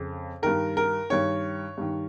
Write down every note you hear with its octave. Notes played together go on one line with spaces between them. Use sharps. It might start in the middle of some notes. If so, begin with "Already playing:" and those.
Already playing: F2 C#3
G2 D#3 A#4
A#4
G2 D#3 C#5
G2 D#3